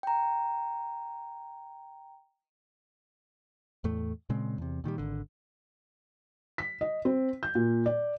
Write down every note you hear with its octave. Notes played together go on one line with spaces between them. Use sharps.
G5 A#5
E2 A2 A3
A#2 C#3 G#3 C4
E2 C3
A#2 D#3 F3 G3
G#1 D3
B6
D#5
C4
G6
A#2
D5